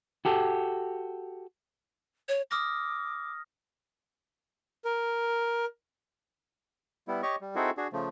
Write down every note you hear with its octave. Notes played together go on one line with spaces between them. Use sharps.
F#4 G4 A4
C#5
D6 D#6 F6 A#6
A#4
G3 B3 E4
G4 C#5 D#5 C#6
G3
C4 D#4 E4 F#4 G#4 A4
D4 F#4 G#4
C#3 F3 A3